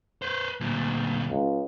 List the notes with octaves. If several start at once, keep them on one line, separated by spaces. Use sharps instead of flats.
B4 C5
D2 A#2
C#2